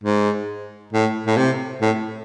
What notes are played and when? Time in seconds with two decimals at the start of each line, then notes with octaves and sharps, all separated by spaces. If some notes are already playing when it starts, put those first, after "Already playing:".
0.04 G#2
0.93 A2
1.27 A2
1.37 C3
1.82 A2